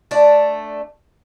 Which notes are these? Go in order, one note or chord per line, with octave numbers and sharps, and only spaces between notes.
A3 D4 D5